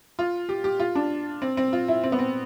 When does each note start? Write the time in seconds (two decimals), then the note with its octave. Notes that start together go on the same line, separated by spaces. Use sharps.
0.19 F4
0.49 G4
0.64 G4
0.80 F4
0.95 D4
1.42 C4
1.57 C4
1.73 F4
1.88 E4
2.04 C4
2.12 B3
2.19 C4